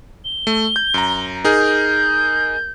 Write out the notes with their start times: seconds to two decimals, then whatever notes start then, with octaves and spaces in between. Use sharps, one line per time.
0.25 G7
0.47 A3
0.76 G6
0.94 F#2 A#5
1.44 D#4 G#4 A#4 G6